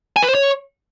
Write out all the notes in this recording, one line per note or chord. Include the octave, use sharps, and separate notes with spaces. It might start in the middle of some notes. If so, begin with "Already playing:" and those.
G#5
B4
C5
C#5